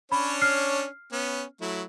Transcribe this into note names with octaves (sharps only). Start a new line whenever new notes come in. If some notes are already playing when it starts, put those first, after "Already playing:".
C#4 D4 C#5 B5
F6 C7
B3 C#4
F#3 A3 E4